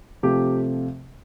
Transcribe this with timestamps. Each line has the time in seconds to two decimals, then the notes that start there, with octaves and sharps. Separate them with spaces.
0.23 C3 F3 A3 G4